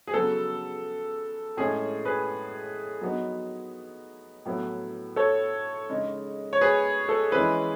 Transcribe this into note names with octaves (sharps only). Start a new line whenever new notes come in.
G#4
C#3 F#3 B3 A4
A2 G#3 C#4 G#4
G#4 B4
F#3 B3 D#4
A2 F#3 B3 E4
A4 C#5
C#3 G#3 D#4
C#5
G#4 B4
A4
E3 G#3 C#4 E4 G#4 B4